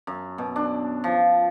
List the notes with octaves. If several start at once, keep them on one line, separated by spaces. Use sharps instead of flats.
F#2
B2
D4
F3